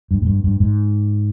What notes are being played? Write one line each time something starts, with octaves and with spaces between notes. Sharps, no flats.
G2
G#2
G2
G2
G#2